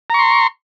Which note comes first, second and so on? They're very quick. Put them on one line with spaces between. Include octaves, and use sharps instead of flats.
A#5 C#6 C6